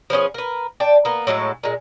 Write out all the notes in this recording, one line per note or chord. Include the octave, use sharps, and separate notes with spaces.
F3 B3 C#4 G#4
A#4 B4
D4 G5 A5
A#3 B3
A2 F#3 G#3 A4
A#2 G#3